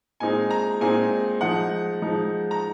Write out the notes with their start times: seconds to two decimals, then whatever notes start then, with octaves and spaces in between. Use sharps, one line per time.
0.20 A#2 G#3 C4 D#4 G#5
0.50 A#5
0.81 A#2 G#3 C4 D#4 G#5
1.41 F3 G#3 D#4 F#5
2.02 F3 G#3 D#4
2.51 A#5